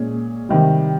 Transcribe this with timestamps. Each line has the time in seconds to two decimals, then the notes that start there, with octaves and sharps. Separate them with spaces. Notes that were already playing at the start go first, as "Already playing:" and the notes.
Already playing: A#2 G#3 C#4 G#4
0.49 C3 D#3 G3